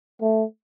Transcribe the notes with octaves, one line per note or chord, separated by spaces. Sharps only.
A3